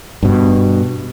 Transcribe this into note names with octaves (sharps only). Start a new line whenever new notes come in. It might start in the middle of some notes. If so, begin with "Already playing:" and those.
G2 B2